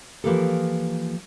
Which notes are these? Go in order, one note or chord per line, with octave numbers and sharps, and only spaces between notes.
E3 F3 A#3 G4 A4